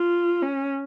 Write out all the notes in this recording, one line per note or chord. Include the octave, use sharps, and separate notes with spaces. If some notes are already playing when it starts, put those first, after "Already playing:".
Already playing: F4
C#4